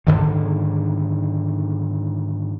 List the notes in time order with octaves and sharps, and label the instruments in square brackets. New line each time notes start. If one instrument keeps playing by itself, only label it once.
[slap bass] G#2 B2 D3 D#3